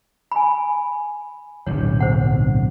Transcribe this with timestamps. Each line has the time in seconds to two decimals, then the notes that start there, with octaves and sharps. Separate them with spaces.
0.32 G#5 B5
1.67 D1 B1 G2 C#5
2.00 C5 F#5